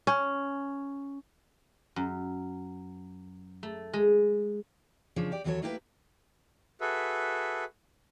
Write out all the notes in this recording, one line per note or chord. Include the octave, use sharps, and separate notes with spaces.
C#4
F#2
A3
G#3
C#3 F3 C#4 D4
G4 D5
D#2 E3 F#3 F4 A4 C#5
A3 A#3 E4 G4 G#4 B4
F#4 G#4 A4 B4 E5